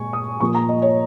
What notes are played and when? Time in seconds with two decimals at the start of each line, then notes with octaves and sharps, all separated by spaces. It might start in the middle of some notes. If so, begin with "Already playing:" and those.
Already playing: A#2 G#3 G#5 C#6
0.13 D#6
0.40 A#2 F3 A#3 C#6
0.55 A#5
0.69 D#5
0.82 C#5